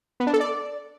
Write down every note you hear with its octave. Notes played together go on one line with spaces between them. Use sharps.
B3
D4
A4
D5